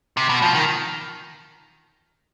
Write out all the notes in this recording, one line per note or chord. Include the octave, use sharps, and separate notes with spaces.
C3
B2
F3
D#3